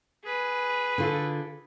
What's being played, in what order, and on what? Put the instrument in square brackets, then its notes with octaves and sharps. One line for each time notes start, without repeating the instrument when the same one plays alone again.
[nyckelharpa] G#4 B4
[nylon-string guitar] D3 F4 A4